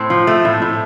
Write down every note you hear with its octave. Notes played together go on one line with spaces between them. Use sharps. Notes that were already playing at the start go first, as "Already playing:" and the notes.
Already playing: A2 C4
F3
A3
A2
A2